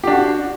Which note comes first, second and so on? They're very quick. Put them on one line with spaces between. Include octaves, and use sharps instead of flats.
G4 D4 F#4